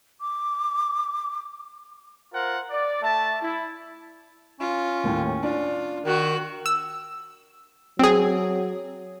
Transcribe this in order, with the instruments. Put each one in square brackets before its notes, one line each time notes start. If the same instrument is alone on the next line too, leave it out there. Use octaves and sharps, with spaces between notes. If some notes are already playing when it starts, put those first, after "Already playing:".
[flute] D6
[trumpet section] F4 A#4 C5 F#5
D5
A3 E5 A5
E4
[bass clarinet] C#4 [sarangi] F4
[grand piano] D#2 A2
[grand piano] D4 [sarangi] F4
[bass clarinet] D#3 [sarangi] F#4
[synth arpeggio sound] E6
[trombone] F#3 [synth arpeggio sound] C4 G#4